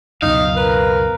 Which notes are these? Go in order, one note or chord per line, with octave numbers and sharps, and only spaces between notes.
C#2 F#2 B2 D#4 F5
A#4 B4